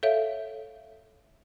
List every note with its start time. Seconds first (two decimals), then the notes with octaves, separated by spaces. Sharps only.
0.03 A4 C#5 E5 F5